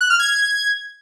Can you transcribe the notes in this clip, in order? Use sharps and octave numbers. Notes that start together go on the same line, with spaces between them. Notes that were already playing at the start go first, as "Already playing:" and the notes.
F#6
F6
G#6